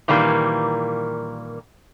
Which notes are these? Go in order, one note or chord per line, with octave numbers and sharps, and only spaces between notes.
A#2 D#3 E3 G3 A#3